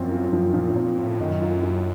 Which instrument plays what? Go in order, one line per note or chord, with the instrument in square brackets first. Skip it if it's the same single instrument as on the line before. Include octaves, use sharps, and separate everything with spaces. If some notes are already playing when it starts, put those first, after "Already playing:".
Already playing: [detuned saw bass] F#2 [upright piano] F3 C4
[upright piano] F4
[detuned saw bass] F#2 [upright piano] F3
[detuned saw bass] A#2 [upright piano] F3
[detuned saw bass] A2
[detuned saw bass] A#2 [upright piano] C4
[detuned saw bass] A2 [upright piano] F4
[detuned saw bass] F#2 [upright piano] D#3
[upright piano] F4
F#3